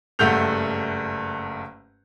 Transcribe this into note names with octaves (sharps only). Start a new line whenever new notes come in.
F#1 G2 A3 F#5 G6 F7